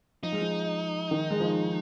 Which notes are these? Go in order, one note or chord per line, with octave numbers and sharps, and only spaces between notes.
F3 D#4
G#3
F3
D#3
G#3
F3